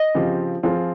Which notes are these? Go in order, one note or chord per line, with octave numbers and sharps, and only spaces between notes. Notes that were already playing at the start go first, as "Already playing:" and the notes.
Already playing: D#5
C#3 F3 C4 G4
F3 C4 F4 G#4